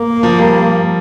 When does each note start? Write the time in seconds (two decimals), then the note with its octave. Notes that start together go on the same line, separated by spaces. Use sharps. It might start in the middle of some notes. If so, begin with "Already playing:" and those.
Already playing: A#3
0.23 F3
0.38 G3